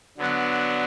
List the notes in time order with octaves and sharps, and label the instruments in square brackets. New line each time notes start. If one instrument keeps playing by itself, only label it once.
[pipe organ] D3 F#3 B3 D4